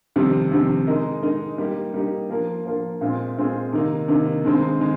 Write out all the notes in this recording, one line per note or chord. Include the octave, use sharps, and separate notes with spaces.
F2 C3 D#3 G3 C4
F2 C3 D#3 G3 C4
G#3 D#4 A#4 D#5
G#3 D#4 A#4 D#5
G3 A#3 D#4 G4
G3 A#3 D#4 G4
F3 A#3 F4 A#4
F3 A#3 F4 A#4
A#2 G#3 C4 F4 G#4
A#2 G#3 C4 F4 G#4
C3 D#3 A#3 D#4
C3 D#3 A#3 D#4
G2 D#3 G#3 C4 D#4
D#3 G#3